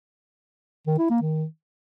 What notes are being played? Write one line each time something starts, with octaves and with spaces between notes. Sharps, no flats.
D#3
E4
A#3
D#3